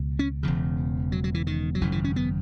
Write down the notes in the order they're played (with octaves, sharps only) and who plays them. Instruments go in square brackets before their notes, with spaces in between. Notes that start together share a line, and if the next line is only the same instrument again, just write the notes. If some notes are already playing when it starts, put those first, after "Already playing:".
Already playing: [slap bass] C#2 B2
C#4
E1 E2 C#3
F#3
F#3
E3
D#3
F#3
G#1 F#2 C#3 E3
E3
C#4
B3